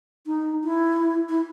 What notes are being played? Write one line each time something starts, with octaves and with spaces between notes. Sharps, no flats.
D#4
E4
E4